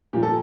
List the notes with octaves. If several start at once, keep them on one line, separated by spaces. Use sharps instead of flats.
A#2 F3 G4
A4